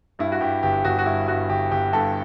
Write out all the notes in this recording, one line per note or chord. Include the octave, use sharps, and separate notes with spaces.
G2 E4
F#4
G2 G4
G1 G4
G1 F#4
F#4
G2 E4
G2 F#4
G1 G4
G1 G4
G2 A4